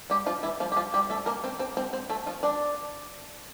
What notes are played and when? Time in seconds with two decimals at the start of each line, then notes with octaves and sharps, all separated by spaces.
0.10 G3 G4
0.26 F3 F4
0.43 E3 E4
0.60 F3 F4
0.72 G4
0.76 F3 F4
0.94 G3 G4
1.10 A3 A4
1.26 A#3 A#4
1.44 C4 C5
1.59 C4 C5
1.77 C4 C5
1.93 C4 C5
2.10 A3 A4
2.26 F3 F4
2.43 D4 D5